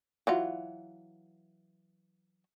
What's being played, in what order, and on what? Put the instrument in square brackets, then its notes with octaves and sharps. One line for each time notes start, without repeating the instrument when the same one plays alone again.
[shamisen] E3 F#3 F4